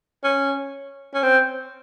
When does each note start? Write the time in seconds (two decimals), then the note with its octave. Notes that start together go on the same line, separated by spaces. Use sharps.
0.24 C#4
1.14 C#4
1.23 C4